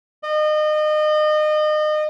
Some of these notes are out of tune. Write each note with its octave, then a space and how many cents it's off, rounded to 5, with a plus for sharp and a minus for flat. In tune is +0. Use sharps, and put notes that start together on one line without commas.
D#5 -30